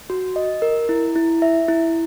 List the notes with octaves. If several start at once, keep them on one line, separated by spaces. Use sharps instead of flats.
F#4
D#5
A#4
E4
E4
E5
E4